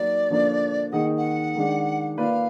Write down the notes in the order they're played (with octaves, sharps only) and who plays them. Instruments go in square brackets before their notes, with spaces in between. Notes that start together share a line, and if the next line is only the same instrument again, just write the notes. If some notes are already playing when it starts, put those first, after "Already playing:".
Already playing: [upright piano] F#3 A#3 D#4 F#4 A#4 [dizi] D5
[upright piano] D3 F3 A#3 D4
[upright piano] D#3 A#3 D#4 G#4 D#5 [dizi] F#5
[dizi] F#5
[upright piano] D#3 G#3 D4
[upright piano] A#3 F4 B4 D5 [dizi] F5